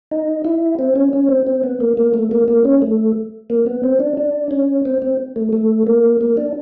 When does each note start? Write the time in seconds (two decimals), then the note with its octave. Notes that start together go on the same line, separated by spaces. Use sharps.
0.11 D#4
0.45 E4
0.79 C4
0.96 C#4
1.13 C#4
1.29 C4
1.47 C4
1.63 B3
1.80 A#3
1.97 A#3
2.14 A3
2.31 A#3
2.48 A#3
2.65 C#4
2.82 A3
3.50 A#3
3.66 B3
3.84 C4
4.00 D4
4.17 D4
4.51 C#4
4.85 C4
5.02 C4
5.36 A3
5.53 A3
5.87 A#3
6.21 A#3
6.37 D4